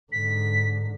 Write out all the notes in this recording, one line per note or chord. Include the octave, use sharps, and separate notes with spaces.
G#2 D3 B6